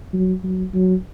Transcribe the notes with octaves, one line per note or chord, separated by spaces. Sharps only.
F#3
F#3
F#3